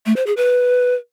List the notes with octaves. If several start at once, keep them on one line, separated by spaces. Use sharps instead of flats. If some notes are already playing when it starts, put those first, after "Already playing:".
A3
C5
G#4
B4